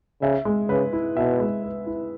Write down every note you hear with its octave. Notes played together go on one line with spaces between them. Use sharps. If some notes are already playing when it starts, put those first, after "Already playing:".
C#3 E5
G#3
C#3 B4
E4
B2 E5
G#3
B4
E4